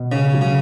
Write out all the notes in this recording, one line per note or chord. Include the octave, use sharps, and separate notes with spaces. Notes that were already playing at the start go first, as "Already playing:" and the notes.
Already playing: B2
C#3 C#4
F#3
C#3